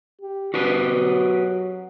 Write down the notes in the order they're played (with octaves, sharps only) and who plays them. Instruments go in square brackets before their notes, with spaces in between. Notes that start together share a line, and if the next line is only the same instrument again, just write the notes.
[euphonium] G4
[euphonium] G2 [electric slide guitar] F#4 G4 B4
[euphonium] F#3